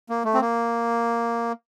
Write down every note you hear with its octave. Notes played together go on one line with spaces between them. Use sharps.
A#3
A3
C4
A#3